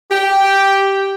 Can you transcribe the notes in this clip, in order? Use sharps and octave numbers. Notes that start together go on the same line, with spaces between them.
G4 G5